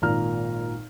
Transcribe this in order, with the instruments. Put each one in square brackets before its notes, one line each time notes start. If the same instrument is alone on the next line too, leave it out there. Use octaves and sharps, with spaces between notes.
[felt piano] G#1 A#2 A#5 F6